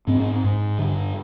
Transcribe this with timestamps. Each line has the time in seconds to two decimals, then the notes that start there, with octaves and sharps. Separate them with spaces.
0.07 G#2 C4
0.20 C4
0.44 G#2
0.79 G2 D3